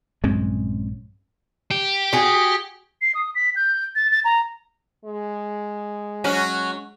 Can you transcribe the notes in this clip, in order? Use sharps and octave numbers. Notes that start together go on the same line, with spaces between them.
A#1 G2 F#3 G#3 C4 C#4
G4
F#4 G#4
C7
D#6
B6
G6
A6
A6
A#5
G#3
F#3 C#4 F#4